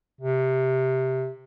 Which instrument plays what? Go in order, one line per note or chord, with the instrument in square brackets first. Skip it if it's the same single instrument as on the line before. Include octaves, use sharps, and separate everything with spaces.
[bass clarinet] C3